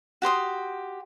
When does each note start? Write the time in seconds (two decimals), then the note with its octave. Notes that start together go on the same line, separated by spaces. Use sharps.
0.22 F#4 G4 C6 D#6